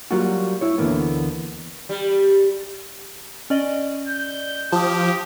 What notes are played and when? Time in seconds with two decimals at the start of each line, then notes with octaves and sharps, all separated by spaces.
0.11 F#3 G3 A#3 F4 F#4
0.61 E4 C#5
0.78 D2 D3 E3 A#3 B3
1.89 G3
3.50 C#4 D5 D#5
4.08 G6
4.72 F3 G4 A5 D#6